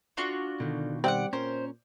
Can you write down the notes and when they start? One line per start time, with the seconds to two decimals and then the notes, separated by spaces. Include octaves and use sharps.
0.17 D4 F4 F#4
0.60 B2 D3 D#3
1.04 G3 C4 D5 F5 F#5
1.33 A#2 C#4 A#4 C5